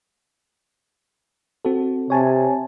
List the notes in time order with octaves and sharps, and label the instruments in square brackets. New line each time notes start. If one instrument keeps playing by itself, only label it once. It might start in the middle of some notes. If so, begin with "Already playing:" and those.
[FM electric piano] C4 F#4 A4
[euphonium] C3 [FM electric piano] C#5 G#5 A5